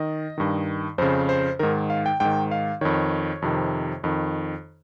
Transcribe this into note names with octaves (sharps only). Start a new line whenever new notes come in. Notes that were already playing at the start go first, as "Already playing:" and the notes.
Already playing: D#3 D#5
G2 D#3
F2 C#3 C5
C5
G#2 D#3 A#4
F5
G5
G#2 D#3 G5
F5
F2 D#3 C#5
F2 C3 D#3
F2 D#3